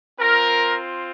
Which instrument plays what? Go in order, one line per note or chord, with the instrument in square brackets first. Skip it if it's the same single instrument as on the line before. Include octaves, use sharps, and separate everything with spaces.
[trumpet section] C4 F4 A#4